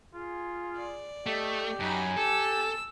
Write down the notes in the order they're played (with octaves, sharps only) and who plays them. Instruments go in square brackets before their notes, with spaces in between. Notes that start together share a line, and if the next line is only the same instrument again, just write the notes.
[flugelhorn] F4 [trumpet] G#4
[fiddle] D5
[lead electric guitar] A3 [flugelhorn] G4 [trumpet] D#5
[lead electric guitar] F#2 [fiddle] D#4 B5 [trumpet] G#5
[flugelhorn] G4 [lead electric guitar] A4 [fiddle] E6